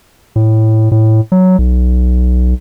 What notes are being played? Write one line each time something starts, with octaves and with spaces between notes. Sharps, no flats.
A2
A2
F#3
B1